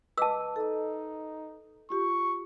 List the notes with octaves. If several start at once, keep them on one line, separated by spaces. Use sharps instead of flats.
B4 D#5 A5 D6 E6
D#4 A4 D#5
F4 G4 C#6